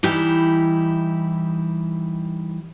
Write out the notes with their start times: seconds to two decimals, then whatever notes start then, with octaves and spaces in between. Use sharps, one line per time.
0.03 E3 G3 D#4 E4 G4